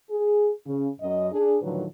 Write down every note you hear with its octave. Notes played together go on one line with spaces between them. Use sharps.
G#4
C#3
F#2 D#5
D4 G#4
A2 D3 D#3 F3 F#3 B4